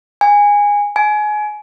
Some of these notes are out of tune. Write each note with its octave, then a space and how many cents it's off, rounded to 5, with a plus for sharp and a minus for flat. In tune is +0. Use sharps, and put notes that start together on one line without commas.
G#5 -15
G#5 +25